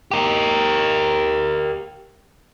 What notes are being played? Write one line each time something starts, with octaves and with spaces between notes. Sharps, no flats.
G4 A#4